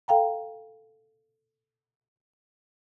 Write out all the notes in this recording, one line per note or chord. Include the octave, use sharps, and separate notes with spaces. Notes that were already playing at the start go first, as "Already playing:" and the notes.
A4 F5 G5 A#5